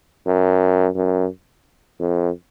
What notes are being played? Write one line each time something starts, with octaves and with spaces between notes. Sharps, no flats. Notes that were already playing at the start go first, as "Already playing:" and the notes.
F#2
F#2
F2